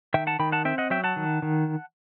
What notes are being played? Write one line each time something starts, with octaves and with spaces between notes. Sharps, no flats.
D#3 E5 G5
F#5 A5
D#3 G5 B5
F#5 A5
C4 E5 G5
D#5 F#5
F#3 E5 G5
F#5 A5
D#3
D#3